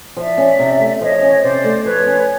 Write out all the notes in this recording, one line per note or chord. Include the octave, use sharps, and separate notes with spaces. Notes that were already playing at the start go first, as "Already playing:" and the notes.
F3 D5 E5
C#4
C3
A3
F3 C#5 D#5
C#4
C3 C5 D5
A3
F3 B4 C#5
C#4